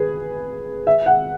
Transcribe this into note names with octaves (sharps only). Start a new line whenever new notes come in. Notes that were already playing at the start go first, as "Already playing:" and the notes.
Already playing: G#4 B4
E5
F#5